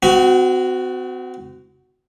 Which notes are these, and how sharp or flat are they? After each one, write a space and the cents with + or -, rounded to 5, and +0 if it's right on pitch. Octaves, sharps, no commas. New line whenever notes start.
C4 -40 F#4 +0